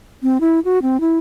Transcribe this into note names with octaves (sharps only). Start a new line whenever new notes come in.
C4
E4
F#4
C4
E4